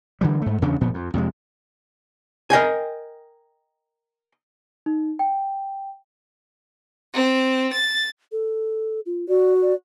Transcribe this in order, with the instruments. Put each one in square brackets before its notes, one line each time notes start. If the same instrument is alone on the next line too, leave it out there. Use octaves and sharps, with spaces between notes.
[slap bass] D3 E3 G3
G#2 A3
E2 C#3 C#4 D4
F#1 A#2 F3 B3
F2
F2 C3 G3 G#3
[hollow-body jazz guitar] A#4 D#5 G5 G#5
[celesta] D#4
G5
[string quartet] C4
A6
[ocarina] A4
F4
[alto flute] F#4 [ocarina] D5
[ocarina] D5